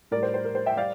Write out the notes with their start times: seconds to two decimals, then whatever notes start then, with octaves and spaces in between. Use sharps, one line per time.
0.11 A2 G3 A#4 D5
0.23 C5
0.34 C5
0.44 A#4
0.55 C5
0.66 E5 G5
0.77 G3 D5 F5